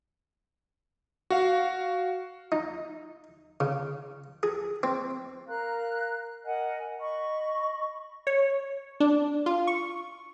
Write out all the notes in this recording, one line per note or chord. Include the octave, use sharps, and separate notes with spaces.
F#4 F5
D#4
C#3
G#4
C4
A#4 F5 A#5 F#6
A#4 D#5 F#5 G#5
D#5 B5 C#6
C#5
D4
F4
C#6